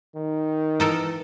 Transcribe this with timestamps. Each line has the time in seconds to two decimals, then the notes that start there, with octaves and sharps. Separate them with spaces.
0.15 D#3
0.80 E3 D#4 A4 A#4